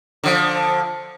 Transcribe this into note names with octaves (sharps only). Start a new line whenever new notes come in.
D3 F3